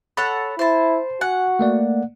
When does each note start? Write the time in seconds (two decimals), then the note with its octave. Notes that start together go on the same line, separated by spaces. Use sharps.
0.17 A4 C#5 F#5 B5
0.59 E4 C5 A5
1.21 F#4 F#5 G#5
1.59 A3 A#3 D5